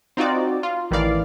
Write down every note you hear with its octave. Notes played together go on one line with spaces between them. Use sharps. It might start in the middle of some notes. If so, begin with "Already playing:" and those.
C4 D#4 F4 F#4 D5
F4
A1 D#3 E3 D5 F5